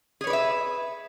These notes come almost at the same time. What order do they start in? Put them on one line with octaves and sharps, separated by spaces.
G#4 C#5 B4 D5 E5